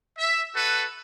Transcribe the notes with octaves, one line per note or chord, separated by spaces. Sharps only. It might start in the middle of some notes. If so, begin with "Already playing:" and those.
E5
F#4 A4 B4